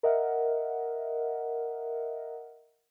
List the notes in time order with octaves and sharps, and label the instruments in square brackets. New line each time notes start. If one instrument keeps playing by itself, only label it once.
[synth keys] A#4 D#5 E5 F#5